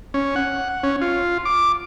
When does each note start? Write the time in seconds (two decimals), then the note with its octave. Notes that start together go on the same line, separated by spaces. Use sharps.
0.14 C#4
0.36 F#5
0.83 C#4
1.02 F4
1.45 D6